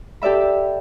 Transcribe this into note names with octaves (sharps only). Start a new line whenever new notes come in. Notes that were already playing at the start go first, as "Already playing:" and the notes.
G4 A4 D5 E5 B5